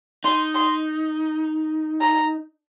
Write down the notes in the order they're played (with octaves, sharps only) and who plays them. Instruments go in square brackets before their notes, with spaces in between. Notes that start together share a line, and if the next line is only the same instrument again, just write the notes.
[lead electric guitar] D#4 [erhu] C6
[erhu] C6
A#5